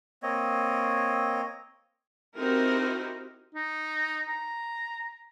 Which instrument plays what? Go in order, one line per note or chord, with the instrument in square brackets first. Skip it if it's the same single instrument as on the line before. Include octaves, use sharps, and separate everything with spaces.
[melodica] A#3 C4 C#5 D#5
[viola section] C4 D#4 E4 F#4 G4 A#4
[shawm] D#4
A#5